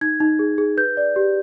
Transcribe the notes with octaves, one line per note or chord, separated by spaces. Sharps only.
D#4 G#6
D#4
G#4
G#4
B4 G6
D5
G4